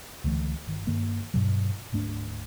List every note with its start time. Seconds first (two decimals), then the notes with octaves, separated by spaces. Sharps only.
0.24 C#2 D3 E3 A3
0.67 G1 D#3
0.87 G2 D#3 A#3
1.34 G2 B2 F#3
1.92 D1 G#2 A3 D4